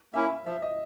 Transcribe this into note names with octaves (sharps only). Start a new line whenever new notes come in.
A#3 C#4 E4 E5
F3 E5
D#5